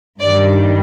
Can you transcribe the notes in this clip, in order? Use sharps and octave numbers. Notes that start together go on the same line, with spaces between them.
G2 D#3 G3 D5